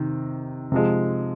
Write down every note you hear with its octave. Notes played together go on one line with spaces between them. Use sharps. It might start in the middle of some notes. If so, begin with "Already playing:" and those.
Already playing: C3 D#3
C3 F3 G#3